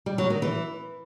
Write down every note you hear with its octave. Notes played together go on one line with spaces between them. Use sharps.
G3
F#3
D#3
E3